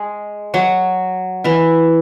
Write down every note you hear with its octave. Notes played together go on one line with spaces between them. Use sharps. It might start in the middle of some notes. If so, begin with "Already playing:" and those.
Already playing: G#3 G#4
F#3 F#4
E3 E4